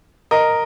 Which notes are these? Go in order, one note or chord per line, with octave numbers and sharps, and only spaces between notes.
A#4 D#5